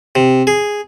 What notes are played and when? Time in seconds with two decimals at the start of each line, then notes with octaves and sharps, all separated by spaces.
0.15 C3
0.47 G#4